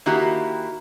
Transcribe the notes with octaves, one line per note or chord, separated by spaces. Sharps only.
D#3 A#3 E4 F#4 G4